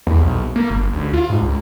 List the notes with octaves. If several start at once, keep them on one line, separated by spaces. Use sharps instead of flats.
E2
B1
A#3
G1
D2
F4
G#2
C#2